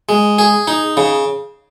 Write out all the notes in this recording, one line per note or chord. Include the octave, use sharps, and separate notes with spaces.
G#3
G#4
D#4
C#3